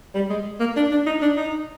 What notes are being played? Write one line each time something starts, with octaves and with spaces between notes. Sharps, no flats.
G3
G#3
A#3
D4
D4
D#4
D4
D#4